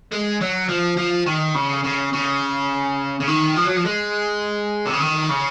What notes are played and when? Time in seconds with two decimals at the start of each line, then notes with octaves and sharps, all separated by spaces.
0.12 G#3
0.41 F#3
0.69 F3
0.97 F3
1.26 D#3
1.55 C#3
1.85 C#3
2.13 C#3
3.20 C#3
3.27 D#3
3.56 F3
3.66 F#3
3.76 F3
3.85 G#3
4.86 C3
4.93 C#3
5.00 D#3
5.29 C#3